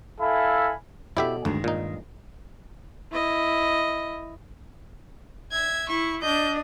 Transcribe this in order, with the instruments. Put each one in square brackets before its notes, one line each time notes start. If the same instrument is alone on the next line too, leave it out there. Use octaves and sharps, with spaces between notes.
[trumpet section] E4 A4 E5 F5 G#5 B5
[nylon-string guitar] B2 A4 D5 [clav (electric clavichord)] E4 G4 E5
[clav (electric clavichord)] D2 [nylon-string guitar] G2 D#3 G#3
[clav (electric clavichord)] A#2 D#4
[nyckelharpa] E4 D#5
[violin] E5 G#6
[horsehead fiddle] E4 [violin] C#6
[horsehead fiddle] D4 D#5 [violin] G6